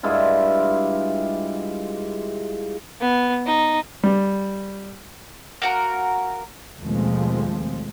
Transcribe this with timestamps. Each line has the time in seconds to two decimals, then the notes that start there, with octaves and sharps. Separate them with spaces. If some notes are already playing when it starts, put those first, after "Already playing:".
0.03 G2 G#3 E4 F4
3.00 B3
3.46 D#4
4.03 G3
5.62 A#3 F#4 A#4
6.80 D#2 B2 F3 G#3 A3 C4